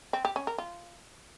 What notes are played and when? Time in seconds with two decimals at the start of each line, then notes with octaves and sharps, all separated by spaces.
0.13 C4
0.25 G4
0.36 C#4
0.47 A#4
0.58 F4